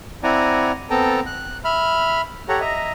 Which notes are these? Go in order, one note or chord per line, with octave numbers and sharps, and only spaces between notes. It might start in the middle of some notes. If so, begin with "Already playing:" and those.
C4 E4 D5 F#5 G#5 A#5
B3 C4 A4 G5 A5 A#5
F#6
E5 B5 F6
G4 A4 C#5 F#5 A#5
D#5 E5 A#5